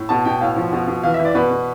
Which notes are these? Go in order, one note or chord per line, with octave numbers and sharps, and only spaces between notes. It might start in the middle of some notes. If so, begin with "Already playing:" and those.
Already playing: A2
B2 A5
B2 G5
A2 F5
F3
B2
B2
E3 F5
E5
E3
D5
B2 B4
B2